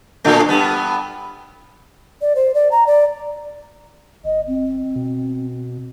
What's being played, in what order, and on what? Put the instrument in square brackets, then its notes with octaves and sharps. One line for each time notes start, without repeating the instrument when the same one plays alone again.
[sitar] A2 D3 A3
G2 B3
[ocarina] D5
C5
D5
A#5
D5
[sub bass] G1 [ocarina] D#5
[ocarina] C4
[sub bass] B2